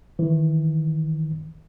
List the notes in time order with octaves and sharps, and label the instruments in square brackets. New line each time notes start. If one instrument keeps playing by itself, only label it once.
[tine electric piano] D#3 E3